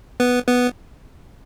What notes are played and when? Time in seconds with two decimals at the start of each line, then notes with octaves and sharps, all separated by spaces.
0.20 B3 B4
0.48 B3 B4